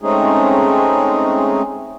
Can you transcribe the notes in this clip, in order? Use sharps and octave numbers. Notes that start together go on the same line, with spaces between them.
G#3 A3 C4 C#4 D#4 G#4